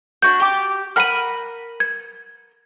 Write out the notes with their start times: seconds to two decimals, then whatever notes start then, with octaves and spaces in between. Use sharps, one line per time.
0.22 D4 F#4 F#5 G6
0.40 G4 D6
0.96 A#4 F#5 B5 F6 D#7
1.80 G#6